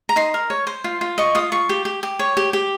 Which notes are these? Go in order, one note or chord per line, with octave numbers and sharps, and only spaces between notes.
A#5
D#4 C6
A#4
C#5
C5
F4
F4
D#5 C#6
F4 D#6
F4 C#6
G4
G4
G4
C#5
G4
G4